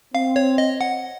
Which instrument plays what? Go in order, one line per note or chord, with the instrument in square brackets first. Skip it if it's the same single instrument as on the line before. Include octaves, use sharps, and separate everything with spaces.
[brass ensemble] C4 [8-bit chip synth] F5
[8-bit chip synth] C#5
D#5
F#5